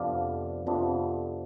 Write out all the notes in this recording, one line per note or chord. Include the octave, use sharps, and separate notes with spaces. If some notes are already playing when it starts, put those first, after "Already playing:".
Already playing: F2 C3 F3 B3 D4 D5 F5
F2 C3 F3 B3 D4